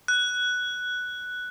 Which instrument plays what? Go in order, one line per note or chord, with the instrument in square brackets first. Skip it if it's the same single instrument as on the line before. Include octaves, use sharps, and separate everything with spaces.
[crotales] F#6